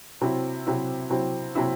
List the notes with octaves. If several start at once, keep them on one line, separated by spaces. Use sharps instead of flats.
C3 F#3 C4 E4
C3 F#3 C4 E4
C3 F#3 C4 E4
C3 F#3 C4 E4